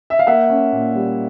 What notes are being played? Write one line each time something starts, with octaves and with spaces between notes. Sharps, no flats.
E5
F5
A#3 E5 F#5
C#4
A#2
G3